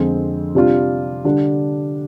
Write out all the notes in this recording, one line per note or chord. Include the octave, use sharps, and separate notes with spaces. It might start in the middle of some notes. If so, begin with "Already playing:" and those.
Already playing: F2 D3 G#3 C4
C3 G3 D4 F4
D3 G3 D4